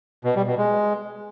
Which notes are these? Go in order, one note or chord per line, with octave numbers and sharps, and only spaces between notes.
B2
G3
B2
G#3